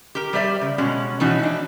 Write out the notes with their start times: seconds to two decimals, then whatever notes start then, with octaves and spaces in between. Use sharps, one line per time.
0.15 G4 A#4
0.33 G3 G4 C5 D5 E5
0.62 C#3
0.78 B2 G#3 C#4 F#4
1.20 B2 E3 C#4 D#4 F#4
1.39 E3 D4